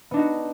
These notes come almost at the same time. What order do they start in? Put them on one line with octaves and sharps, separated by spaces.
B3 D4 D#4 F#4